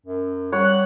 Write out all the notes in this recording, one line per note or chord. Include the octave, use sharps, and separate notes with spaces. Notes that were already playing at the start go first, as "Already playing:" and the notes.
F#2
G3 C#5 F#5
F#6